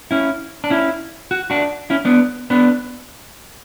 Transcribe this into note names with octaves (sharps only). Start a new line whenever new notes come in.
C#4 E4
D4
C#4 E4
F#4
D4 F#4
C#4 E4
B3 D4
B3 D4